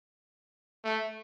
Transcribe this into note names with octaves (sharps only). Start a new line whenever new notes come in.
A3